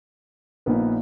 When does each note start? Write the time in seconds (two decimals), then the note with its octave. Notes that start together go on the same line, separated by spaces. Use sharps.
0.66 A#1 A#2 A#3 B3 D#4 B4